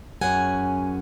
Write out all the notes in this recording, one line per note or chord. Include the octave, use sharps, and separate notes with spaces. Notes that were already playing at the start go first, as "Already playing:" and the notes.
F#2 C#4 G#4 F#5 G#5